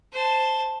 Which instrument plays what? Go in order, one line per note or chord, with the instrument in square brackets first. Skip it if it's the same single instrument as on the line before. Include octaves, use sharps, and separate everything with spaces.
[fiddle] C5 A5